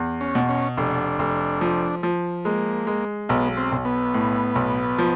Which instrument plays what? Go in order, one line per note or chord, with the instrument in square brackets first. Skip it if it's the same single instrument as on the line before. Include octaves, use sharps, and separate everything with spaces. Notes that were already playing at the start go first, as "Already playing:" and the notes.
Already playing: [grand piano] E2
[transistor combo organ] C#4
[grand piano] B2
[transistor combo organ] C#4
[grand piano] F1 [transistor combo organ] D4
[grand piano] F1
F3
F3
[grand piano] G#3 [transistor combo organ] A#3
[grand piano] G#3
[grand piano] B1 [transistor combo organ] B3
[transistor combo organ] C4
[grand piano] B1
[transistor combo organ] B3
[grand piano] A2
B1
F3